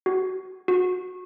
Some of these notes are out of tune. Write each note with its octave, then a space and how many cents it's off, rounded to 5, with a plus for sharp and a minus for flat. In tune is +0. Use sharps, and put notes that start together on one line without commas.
F#4 +15
F#4 -25